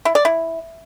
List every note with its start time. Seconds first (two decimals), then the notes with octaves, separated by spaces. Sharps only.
0.05 E4
0.15 D5
0.25 E4